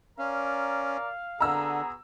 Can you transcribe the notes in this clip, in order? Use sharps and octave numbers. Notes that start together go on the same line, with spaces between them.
C#4 A#4 D5 F5 A#5
D3 B3 F#4 G#4 A#5 E6